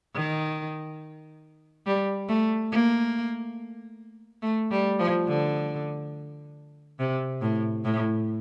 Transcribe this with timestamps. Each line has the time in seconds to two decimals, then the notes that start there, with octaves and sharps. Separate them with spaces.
0.15 D#3
1.86 G3
2.28 A3
2.72 A#3
4.42 A3
4.71 G3
4.99 F3
5.28 D3
6.99 C3
7.41 A2
7.84 A2